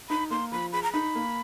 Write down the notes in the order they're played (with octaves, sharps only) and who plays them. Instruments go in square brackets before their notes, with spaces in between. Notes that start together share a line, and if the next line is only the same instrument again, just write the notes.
[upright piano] D#4 [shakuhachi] B5
[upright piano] A#3 [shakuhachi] C6
[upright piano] F3 [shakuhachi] B5
[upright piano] G#4 [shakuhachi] B5
[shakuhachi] A#5
[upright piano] D#4 [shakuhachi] B5
[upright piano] A#3